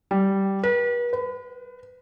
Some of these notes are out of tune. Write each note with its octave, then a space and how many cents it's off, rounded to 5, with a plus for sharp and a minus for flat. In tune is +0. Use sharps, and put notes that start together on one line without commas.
G3 -10
B4 -40
B4 +30